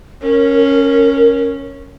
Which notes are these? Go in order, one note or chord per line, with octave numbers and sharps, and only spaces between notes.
C#4 A#4